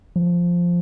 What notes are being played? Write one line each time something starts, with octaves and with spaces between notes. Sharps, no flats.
F3